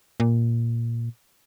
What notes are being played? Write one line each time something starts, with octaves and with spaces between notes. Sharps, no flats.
A#2